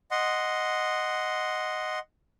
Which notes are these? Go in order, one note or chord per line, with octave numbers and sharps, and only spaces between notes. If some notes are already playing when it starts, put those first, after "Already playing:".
D#5 F#5 C6